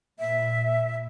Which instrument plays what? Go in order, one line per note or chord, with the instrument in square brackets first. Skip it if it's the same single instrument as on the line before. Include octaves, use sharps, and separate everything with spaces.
[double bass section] A#2 [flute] E5